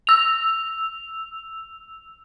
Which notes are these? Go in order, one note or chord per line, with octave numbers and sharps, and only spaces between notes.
E6 F7